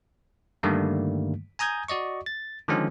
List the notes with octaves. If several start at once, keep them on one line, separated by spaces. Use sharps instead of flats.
G2 D3 D#3 G3 A3 A#3
G#5 A#5 D#6 G6 G#6
F#4 D5 D#5 C#6
A6
D3 D#3 F3 G#3 C#4